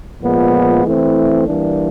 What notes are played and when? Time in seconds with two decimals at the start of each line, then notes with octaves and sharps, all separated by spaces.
0.21 A#2 F3 G#3 B3
0.84 E3 A3 C4 E4
1.47 E3 G3 A#3 D4